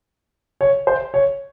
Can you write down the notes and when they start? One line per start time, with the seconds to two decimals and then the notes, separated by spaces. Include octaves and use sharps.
0.61 C#5
0.87 C5
1.14 C#5